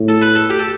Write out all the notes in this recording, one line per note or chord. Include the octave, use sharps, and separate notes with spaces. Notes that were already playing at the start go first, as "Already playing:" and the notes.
Already playing: A2
A4
B4
A4
G4
A4